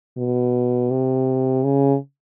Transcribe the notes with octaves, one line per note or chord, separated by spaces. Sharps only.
B2
C3
C#3